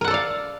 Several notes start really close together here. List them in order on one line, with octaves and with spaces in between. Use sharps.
A#4 F#5 A4 D5 F5